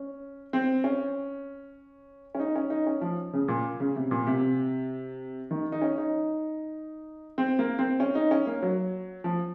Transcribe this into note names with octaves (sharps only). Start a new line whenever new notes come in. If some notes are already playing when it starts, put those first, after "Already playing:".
Already playing: C#4
C4
C#4
C#4
D#4
C#4
D#4
C#4
F3
C#3
A#2
C#3
C3
A#2
C3
D#3
D#4
C#4
D#4
C4
A#3
C4
C#4
D#4
C#4
A#3
F#3
F3